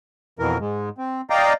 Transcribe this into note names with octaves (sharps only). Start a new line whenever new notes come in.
F2 B2 E3 A#4
G#2 G#3
C4
D5 D#5 F5 G5 A#5